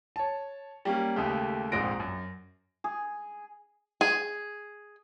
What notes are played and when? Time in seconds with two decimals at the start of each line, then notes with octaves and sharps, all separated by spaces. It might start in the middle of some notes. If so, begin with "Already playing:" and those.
0.16 C#5 A5
0.85 G3 A#3 C#4
1.16 D#2 C#3 G#3 A3 G4
1.72 A#1 F2 G#2 F3 A#6 D7
2.00 F#2
2.84 G#4
4.01 G#4